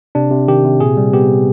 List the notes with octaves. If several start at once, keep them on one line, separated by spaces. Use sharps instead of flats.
C3 D4
C3
D#3 G4
C3
A#2 G#4
G3
B3 G4